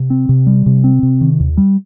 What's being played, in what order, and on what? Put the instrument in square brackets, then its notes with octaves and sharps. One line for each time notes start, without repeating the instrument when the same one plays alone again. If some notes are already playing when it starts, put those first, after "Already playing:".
Already playing: [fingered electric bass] C3
C4
C3
G3
C3
C4
C3
D#3
D#2
G3